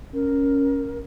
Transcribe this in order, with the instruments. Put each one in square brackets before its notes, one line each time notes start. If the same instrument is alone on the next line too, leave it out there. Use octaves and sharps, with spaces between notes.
[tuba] C#4 [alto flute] A#4